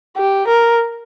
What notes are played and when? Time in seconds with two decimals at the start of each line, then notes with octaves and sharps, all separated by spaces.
0.17 G4
0.48 A#4